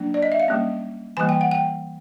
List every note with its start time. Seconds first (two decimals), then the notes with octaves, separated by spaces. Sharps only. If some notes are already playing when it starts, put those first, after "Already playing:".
Already playing: F#3 A#3 D4
0.14 D5
0.22 D#5
0.32 E5
0.40 F5
0.48 G3 A#3 C#4
1.17 E3 G3 A#3 G#5
1.29 G5
1.41 F#5
1.51 G5